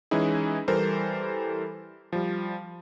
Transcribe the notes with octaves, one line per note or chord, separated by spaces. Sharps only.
E3 G#3 C#4 D#4 E4 G#4
E3 G3 A4 A#4 C5
F3 G3